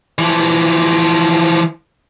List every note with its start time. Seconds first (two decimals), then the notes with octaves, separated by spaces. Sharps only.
0.19 E3 F3